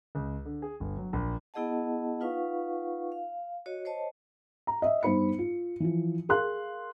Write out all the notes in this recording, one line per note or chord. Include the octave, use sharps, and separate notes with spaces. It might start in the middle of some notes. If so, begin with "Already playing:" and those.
C#2
D3
G#4
G1
F#3
A#1
B3 E4 G#4 D#5 F#5 A5
D#4 F4 B4 F5 F#5 C#6
F5
F#4 C#5 D#5
C5 C#5 D#5 A5
A#5
D#5 E5
G2 B3 D#4 C5 B5 C#7
F4
E3 F3 F4
G#4 A#4 F5 C6 F#6